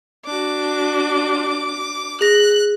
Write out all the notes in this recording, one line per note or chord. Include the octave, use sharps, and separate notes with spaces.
D4 F#4 D6
G#4 F#6 A#6